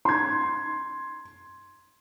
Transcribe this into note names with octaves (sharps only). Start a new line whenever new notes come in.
C6 G#6